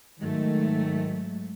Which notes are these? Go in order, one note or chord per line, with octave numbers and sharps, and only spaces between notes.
G#2 D#3 F#3 A3